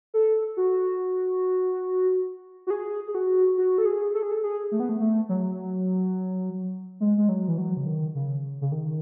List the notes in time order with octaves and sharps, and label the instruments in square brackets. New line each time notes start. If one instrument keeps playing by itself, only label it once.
[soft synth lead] A4
F#4
F#4
G#4
G#4
F#4
F#4
A4
G#4
A4
G#4
A4
G#4
A3
B3
A3
A3
F#3
G#3
G#3
F#3
E3
F#3
C#3
D#3
C#3
C#3
D#3